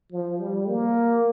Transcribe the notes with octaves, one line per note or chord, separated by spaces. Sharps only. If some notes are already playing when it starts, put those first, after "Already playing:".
F3
G3
A#3